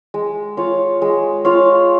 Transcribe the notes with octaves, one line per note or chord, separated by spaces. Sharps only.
G#3
F4 C#5 F5
G#3
F4 C#5 F5